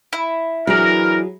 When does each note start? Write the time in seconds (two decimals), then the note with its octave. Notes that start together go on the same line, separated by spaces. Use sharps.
0.13 E4
0.67 E3 F#3 D4 G#4 A#4